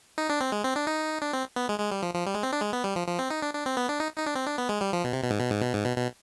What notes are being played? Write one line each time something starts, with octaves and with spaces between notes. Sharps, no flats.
D#4
D4
C4
G#3
C4
D4
D#4
D4
C4
B3
G#3
G#3
G3
F3
F3
G3
G#3
C4
D4
G#3
B3
G3
F3
F3
C4
D#4
D4
D4
C4
B3
D4
D#4
D#4
D4
C4
D4
B3
G#3
G3
F3
B2
C3
B2
G#2
B2
G#2
B2
G#2
B2
B2